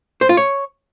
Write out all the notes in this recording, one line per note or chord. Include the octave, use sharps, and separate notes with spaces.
C5
F4
C#5